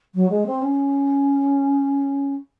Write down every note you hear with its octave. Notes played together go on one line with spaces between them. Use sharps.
F#3
G#3
C4
C#4